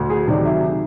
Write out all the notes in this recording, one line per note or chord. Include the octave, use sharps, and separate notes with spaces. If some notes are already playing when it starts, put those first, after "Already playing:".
Already playing: D2
G#4
C3 D#3 F#3 D5
E5